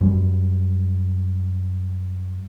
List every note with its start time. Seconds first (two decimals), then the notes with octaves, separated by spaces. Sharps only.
0.01 F#2 G3